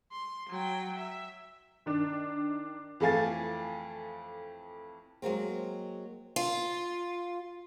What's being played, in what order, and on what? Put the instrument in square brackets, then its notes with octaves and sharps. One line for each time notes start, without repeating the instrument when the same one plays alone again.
[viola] C6
F#3 G5
E5
[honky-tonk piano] D#3 D4
F2 E3 A3 F5 G#5 A6
[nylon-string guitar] F#3 G#3 A#3 C4
[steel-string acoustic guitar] F4